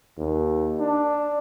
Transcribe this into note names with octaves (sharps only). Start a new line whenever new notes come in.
D#2
D4